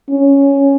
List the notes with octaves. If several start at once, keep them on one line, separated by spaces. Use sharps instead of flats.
C#4